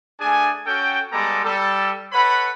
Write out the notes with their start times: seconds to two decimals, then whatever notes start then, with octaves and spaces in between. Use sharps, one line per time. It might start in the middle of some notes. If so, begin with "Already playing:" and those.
0.20 A3 D4 G#4 G#5
0.67 C#4 F#4 A4 G5
1.12 G3 G#3 B3 A4 A#5 D6
1.44 G3 A4
2.13 A4 B4 C#5 F#5 B5